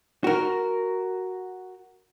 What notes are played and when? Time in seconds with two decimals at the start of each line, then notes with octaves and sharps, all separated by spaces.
0.24 F#4 A#4